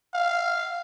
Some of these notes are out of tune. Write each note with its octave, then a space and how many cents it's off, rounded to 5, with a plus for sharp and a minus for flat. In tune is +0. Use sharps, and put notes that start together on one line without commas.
F5 -5